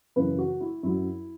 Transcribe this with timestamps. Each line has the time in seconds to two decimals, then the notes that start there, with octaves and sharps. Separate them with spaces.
0.16 F#2 C#3 E3 B4
0.38 F#4
0.61 E4
0.83 F#2 F#3 E4